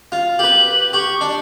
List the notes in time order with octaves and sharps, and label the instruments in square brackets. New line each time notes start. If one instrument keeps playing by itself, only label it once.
[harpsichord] F4
[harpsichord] G4 B4 [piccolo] F#7
[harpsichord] G4 [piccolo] C#6
[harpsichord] D4